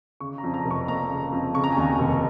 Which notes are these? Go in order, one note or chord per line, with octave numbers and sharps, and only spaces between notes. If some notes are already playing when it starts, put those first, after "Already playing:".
C#3 C#6
A#5
F2
A#5
F1
C#6
A#3 A#5
C#3
F2
C#3 C#6
A#5
G#5
D#2 A#5
F1